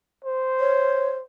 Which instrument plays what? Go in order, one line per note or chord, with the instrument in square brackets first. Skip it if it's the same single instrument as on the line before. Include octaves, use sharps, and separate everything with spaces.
[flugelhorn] C5
[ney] C#5